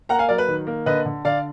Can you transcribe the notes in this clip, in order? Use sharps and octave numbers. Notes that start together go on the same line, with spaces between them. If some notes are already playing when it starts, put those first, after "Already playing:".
A#3 F#5 A#5
F5 G#5
F#3 A#4 D5
B4
D#3
A#3
D3 B4 D#5
D3
D3 D5 F5